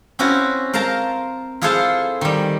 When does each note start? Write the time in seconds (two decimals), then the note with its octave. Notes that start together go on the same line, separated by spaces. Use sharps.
0.19 C4 C#4 E4 F#4 B4
0.73 A#4 C5 F5 A5 A#5
1.61 E4 F4 G#4 A4 C5 F5
2.21 D#3 G3